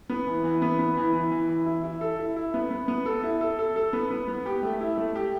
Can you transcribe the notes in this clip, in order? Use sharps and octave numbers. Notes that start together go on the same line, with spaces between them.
B3
E3
E3
B3
B3
E3
E3
E3
E3
E4
E4
A4
E4
E4
B3
B3
B3
A4
E4
A4
A4
A4
B3
B3
B3
G4
A3
E4
A3
G4